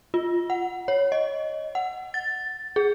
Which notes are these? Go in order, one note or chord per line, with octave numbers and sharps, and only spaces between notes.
F4
F#5
C#5
D#5
F#5
A6
G#4